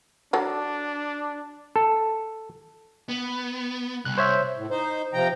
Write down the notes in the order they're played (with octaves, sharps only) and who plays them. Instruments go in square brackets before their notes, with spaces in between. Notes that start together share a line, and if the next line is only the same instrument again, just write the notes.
[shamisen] F#3 A4 [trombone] D4
[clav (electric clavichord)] A4
[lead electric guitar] B3
[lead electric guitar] C2 [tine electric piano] F#6
[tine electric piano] C5 C#5 E5
[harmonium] A2
D#4 C5
C3 F3 G5 A#5